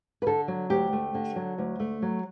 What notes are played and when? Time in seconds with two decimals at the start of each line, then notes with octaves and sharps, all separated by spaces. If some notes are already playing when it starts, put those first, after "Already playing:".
0.22 B4
0.27 D3 A4
0.48 F#3
0.70 D2 G4
0.93 A3
1.14 D3
1.36 F#3
1.58 D2
1.80 A3
2.02 F#3